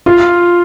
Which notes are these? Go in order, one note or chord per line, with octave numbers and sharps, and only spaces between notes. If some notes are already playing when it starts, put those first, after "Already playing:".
F4